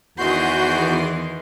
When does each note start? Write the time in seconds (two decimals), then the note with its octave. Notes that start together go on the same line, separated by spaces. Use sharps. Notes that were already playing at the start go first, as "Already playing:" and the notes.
0.18 E2 D#3 E3 F#4 G#4 C6 G6